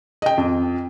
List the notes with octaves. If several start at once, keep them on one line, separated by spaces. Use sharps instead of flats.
D#5 G5
F2